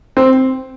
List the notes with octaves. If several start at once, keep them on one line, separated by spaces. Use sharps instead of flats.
C4